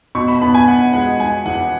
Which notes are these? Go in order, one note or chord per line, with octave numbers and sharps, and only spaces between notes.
B2 C#6
B5
B3 B5
G#5
B3 F#5
G#3 F#5
G#3 G#5
E2 F#5